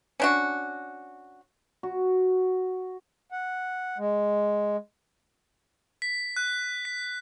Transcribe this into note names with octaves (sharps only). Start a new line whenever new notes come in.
C#4 D4 F#4
F#4
F#5
G#3
B6
F#6
B6